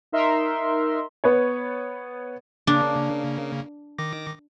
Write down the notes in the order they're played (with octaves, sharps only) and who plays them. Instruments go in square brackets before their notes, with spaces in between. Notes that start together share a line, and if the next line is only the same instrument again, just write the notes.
[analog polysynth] D#4 A#4 E5 C6
[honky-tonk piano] B3 B4 C#5
[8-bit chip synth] C#3 A#3 [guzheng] D4
[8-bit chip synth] D#3 D6 A#6